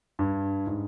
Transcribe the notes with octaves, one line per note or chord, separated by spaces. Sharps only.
G2
G#2